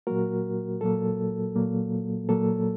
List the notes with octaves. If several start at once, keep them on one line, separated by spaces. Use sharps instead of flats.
A#2 F#3 A#3 F#4 A#4
A#2 F#3 A#3 A4
A#2 F#3 A#3
A#2 F#3 A#3 A4